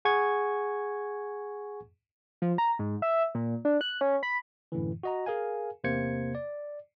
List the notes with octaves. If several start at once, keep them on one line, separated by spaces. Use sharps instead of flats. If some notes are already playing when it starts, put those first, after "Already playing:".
G#4 F#5 G#5 C#6 G#6
F3
A#5
G#2
E5
A#2
D4
F#6
C#4
B5
F#2 A2 D3 E3
F#4 D#5 A#5
G#4 A#4 F5 G#5
E2 C3 A#3 C5 G#6 C#7
D5